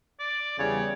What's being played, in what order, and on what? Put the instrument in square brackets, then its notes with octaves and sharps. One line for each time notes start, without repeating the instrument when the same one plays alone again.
[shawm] D5
[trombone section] E2 C#3 G3 [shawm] C#5